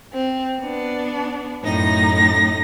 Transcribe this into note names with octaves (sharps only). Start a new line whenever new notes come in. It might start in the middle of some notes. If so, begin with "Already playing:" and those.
C4
B3 D4
F#2 A2 D#4 A#6